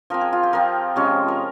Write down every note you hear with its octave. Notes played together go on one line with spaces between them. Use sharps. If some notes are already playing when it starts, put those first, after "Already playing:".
F3 C4 A#4
G#4
F4
G4
F3 C4 A#4
C3 F3 G#3 C#4
A#4